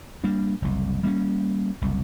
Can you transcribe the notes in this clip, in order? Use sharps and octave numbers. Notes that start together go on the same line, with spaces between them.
G3 A#3 D4
F#1 C2
G3 A#3 C4 C#4
F#1 C2